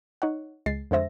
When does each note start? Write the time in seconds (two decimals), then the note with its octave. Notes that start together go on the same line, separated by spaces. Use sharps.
0.22 D#4 C#5 F#5
0.66 C#2 G#3 A6 C7
0.91 F2 D3 G#3 C5 E5 A#6